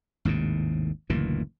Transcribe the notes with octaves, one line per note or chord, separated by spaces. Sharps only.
G#1 D#2 A2 C3
F#1 D2 A#2 E3